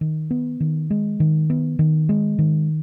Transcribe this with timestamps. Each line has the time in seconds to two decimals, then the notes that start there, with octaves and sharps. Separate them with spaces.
0.01 D#3
0.31 B3
0.60 D#3
0.90 G#3
1.20 D#3
1.50 B3
1.79 D#3
2.09 G#3
2.39 D#3